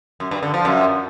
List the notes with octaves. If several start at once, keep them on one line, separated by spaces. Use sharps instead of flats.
F#2
G2
D3
F3
F#2